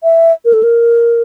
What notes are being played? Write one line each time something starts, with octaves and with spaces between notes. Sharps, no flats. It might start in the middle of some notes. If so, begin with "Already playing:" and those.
E5
A#4
A4
A#4